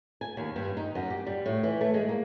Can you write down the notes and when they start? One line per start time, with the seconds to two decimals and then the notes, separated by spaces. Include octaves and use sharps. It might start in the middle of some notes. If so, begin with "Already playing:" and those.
0.21 G#5
0.37 D#2
0.56 G2
0.77 D#4
0.95 F#2
1.10 G4
1.26 G3
1.46 A2
1.63 E3
1.81 A3
1.94 G#3
2.09 A#3